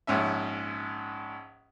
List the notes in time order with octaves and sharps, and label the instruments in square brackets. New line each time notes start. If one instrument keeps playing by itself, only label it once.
[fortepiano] A#1 G#2 C#4 E5